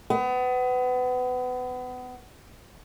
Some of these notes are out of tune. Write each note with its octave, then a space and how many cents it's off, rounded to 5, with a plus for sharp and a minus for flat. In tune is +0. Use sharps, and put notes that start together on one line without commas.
B3 +30